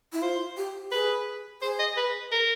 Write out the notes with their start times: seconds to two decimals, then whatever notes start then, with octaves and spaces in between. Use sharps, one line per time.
0.13 E4
0.22 F4 C5
0.57 G4
0.92 G#4 B4
1.62 G#4 C5
1.79 D#5
1.97 B4
2.32 A#4